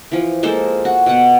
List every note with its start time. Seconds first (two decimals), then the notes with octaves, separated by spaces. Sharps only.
0.12 E3 F3
0.43 G#3 A#3 A4 C5
0.85 F#4
1.06 B2 F#5